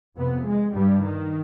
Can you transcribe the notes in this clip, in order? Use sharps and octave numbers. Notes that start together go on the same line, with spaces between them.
F2 C3 B3
G#3
G2 G3
D#3